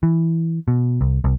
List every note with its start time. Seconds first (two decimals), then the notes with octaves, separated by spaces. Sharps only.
0.03 E3
0.68 B2
1.01 C2
1.24 C2